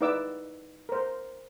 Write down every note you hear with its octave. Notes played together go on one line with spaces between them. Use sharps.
D#4 E4 B4 D5 D6 E6
A#4 C5